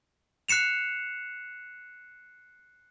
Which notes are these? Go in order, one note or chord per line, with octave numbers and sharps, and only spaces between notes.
F#6 C7 C#7 E7 F7